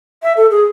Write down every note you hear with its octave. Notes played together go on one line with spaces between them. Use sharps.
E5
A4
G#4